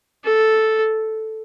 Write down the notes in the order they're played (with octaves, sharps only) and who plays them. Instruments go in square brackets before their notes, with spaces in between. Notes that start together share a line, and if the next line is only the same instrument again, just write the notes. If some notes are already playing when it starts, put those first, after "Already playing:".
[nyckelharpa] A4